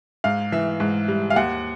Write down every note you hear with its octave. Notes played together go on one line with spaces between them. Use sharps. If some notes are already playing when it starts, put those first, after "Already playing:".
G#2 F5
E3 E5
G#2
G3
F5
D#2 F#5